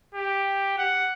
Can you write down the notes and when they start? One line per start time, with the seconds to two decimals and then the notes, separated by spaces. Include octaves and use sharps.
0.15 G4
0.78 F#5